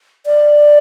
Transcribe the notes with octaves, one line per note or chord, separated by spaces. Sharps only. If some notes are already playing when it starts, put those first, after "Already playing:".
D5